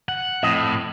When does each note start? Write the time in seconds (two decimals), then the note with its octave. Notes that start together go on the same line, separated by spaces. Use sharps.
0.09 F#5
0.43 F2 A2 D#5